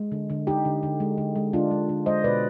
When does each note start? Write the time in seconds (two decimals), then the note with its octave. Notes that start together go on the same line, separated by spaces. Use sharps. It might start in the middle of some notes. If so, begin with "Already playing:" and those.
Already playing: G#3
0.12 D3
0.30 D3
0.47 D3 D#4 G4
0.65 D3
0.83 D3
1.00 G#3
1.18 D3
1.36 G#3
1.53 D3 D4 F4
1.71 G#3
1.89 D3
2.06 G#3 C5 D#5
2.24 B2 B4 D5